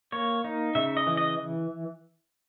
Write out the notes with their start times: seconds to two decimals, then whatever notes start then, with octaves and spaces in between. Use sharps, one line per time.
0.12 A#3 C#5
0.44 D#4
0.75 C#3 E5
0.97 D#5
1.07 E3
1.17 D#5